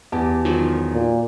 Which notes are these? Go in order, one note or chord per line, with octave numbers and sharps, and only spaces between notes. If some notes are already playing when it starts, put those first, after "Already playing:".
E2 G4 A5
D#3 F3 F#3
A#2